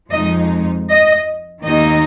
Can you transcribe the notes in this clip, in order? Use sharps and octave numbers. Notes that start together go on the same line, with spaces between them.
F2 F3 G#3 D#4 D#5
D#5
D#2 D#3 A#3 D#4 D#5